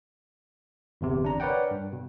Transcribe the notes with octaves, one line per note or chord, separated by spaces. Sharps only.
G1 E2 C3
D4 A#5
A#4 B4 C#5 D5 F#5 G5
G2
B2